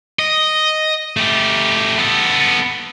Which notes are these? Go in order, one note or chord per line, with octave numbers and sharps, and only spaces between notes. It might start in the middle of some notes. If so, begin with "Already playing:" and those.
D#5
A3 G4
B3 A4